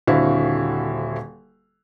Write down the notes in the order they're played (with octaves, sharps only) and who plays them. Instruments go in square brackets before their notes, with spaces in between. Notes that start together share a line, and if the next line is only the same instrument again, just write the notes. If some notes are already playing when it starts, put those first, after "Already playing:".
[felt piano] D#1 D3 C4 E4 F#4 F5